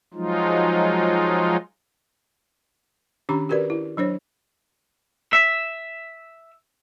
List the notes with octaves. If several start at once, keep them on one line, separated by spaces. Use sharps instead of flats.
F3 F#3 G#3 D#4 F4
D#3 C#4 D4 G4 A#5 B5
F#4 G4 A#4 B4 D5
E4
F#3 D4 C5 C#5
E5